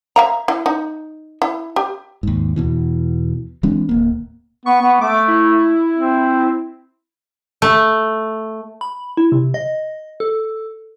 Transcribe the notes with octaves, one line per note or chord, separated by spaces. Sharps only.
E5 F5 A#5
E4
D#4
E4
G4
D#2 G#2
E2 B2 E3
E3 G#3 C4 D4
D1 A#3
B3 C#6
B3
A3 D6
E4
C4
A3
B5
E4
C3
D#5
A4